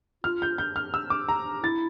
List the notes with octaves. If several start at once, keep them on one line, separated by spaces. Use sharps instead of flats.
F4 F6
G6
G6
F6
E6
D6
A#5
E4 A6